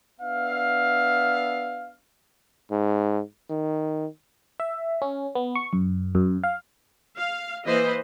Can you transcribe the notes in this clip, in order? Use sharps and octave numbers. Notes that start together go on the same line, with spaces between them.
B3 D4 E5 F5
G#2
D#3
E5
C#4
B3
C#6
F#2
F#2
F5
F5
E3 A#3 B4 C5 D#5